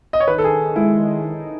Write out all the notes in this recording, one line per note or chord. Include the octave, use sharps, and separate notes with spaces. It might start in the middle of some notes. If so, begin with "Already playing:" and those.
D#5
C#5
D#3 B4
A4
G#4
D#3
G#3 E4
D#3
D#4